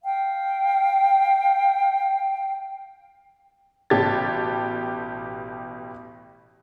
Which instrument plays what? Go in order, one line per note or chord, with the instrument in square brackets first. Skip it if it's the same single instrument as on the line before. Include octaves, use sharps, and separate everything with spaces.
[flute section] F5 G5
[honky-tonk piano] A1 B2 G4 A5 G#6 A6